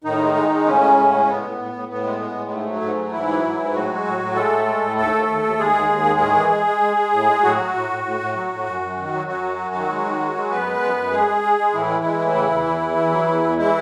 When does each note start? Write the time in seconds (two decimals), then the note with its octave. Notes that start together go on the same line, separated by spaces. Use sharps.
0.04 A2 D#3 D#4
0.19 G#3
0.35 G#3
0.50 G#3
0.65 A2 C#3 C#4
0.81 G#3
0.96 A2
1.12 G#3
1.27 A2 B3
1.43 A2
1.58 A2
1.73 A2
1.88 A2 B3
2.04 G#3
2.20 G#3
2.35 A2
2.50 G#2 A3
2.66 F#3
2.81 G#2
2.97 F#3
3.12 G#2 E3 E4
3.28 F#3
3.43 G#2
3.58 G#2
3.73 A2 F#3 F#4
3.89 G#3
4.05 A2
4.20 A2
4.35 G#3 A3 A4
4.50 A2
4.66 G#3
4.82 A2
4.96 D#2 A3 A4
5.13 D#2
5.28 D#2
5.43 D#2
5.58 D#2 G#3 G#4
5.73 D#2
5.89 D#2
6.04 D#3
6.20 A2
6.35 E3
6.51 G#3
6.66 G#3
6.81 G#3
6.97 G#3
7.13 A2
7.28 G#3
7.43 A2 F#3 F#4
7.58 F#3
7.74 A2
7.89 A2
8.04 A2
8.20 A2
8.35 F#3
8.51 A2
8.66 F#2
8.81 F#2
8.97 D#3
9.13 F#3
9.27 F#2 F#3 F#4
9.43 F#2
9.58 F#2
9.74 D#3
9.89 G#3
10.05 D#3
10.20 G#3
10.36 G#3
10.50 F#2 B3 B4
10.66 G#3
10.82 F#2
10.97 F#2
11.12 G#3 G#4
11.27 G#3
11.44 G#3
11.59 G#3
11.73 A2 E3 E4
11.89 G#3
12.04 G#3
12.19 A2
12.35 C#3
12.50 E2
12.66 E2
12.81 E2
12.97 E2
13.12 F#3
13.28 E2
13.44 E2
13.58 E3 G#3 E4